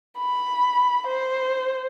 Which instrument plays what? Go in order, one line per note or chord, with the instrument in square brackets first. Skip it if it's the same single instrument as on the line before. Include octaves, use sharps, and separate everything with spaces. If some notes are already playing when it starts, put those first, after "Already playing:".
[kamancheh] B5
C5